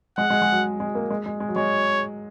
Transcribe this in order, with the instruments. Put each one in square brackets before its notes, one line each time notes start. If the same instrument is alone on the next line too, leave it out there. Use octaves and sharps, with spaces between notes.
[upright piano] G#3 [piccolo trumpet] F#5
[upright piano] G#3
G#3
F#3
G#3
A#3
G#3
G#3
G#3
F#3
[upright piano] G#3 [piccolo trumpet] C#5